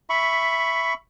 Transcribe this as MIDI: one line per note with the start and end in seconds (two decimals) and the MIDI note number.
0.10 0.94 76
0.10 0.94 83
0.10 0.94 85